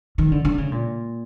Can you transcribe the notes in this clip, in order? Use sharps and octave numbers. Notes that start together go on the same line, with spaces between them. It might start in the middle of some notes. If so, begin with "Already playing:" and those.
D#3
D3
D3
C#3
A#2